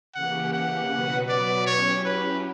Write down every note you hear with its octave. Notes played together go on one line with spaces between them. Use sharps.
C#3 E3 A#3 C#4 G4 F#5
F#5
B2 F#3 B3 F#4 B4
D5
F#3 C#4 E4 G4 C#5
B4